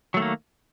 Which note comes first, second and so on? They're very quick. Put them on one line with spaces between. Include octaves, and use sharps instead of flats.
F#3 A3 D#3 A#3